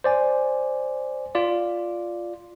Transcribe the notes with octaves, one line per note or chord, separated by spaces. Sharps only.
C5 D5 G#5
F4 D5